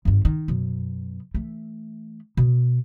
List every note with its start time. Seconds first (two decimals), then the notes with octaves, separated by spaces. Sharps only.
0.05 G#1 G2
0.25 D#3
0.48 F#2 B2
1.34 E3 A3
2.37 B2